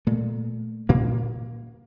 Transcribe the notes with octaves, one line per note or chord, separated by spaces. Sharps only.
A#2 A3
A#2 A#3